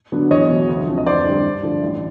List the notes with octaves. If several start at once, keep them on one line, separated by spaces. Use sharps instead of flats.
D3 F#3 B3 D4
E2 C#5 D#5
B2 F#3
D2
C3 F3
D#5
F2 C5 D5
D3 G3 C4
G2
D3 F3 A3
A1